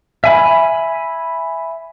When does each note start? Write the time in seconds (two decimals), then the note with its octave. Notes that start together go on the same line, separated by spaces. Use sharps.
0.24 E5 G#5 B5